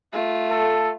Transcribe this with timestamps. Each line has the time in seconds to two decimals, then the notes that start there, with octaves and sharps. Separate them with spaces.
0.12 A3 F4
0.51 A4